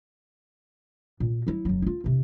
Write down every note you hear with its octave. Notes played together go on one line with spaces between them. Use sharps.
A#2
F#3 E4
F#1 F#3
E4 F4
E1 C3